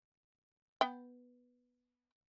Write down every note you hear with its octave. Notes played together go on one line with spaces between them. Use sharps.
B3 G5